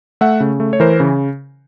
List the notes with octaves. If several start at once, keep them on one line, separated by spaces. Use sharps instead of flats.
A3 E5 F#5
C#3
A3
C#5
E3 A#4 C5
C#3